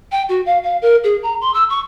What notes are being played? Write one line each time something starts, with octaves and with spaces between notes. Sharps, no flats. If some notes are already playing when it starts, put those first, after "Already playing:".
G5
F#4
F5
F5
A#4
G#4
A#5
C6
E6
C#6